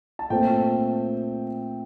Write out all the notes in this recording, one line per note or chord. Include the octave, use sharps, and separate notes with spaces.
A5
A#2 A3 C4 G5